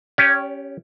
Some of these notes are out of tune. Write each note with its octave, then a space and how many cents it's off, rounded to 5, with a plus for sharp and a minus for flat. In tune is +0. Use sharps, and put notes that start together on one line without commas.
C#4 +0 G4 +0 C#5 +45